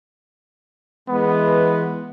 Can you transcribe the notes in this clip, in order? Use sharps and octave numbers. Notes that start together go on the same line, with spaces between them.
E3 G#3 B3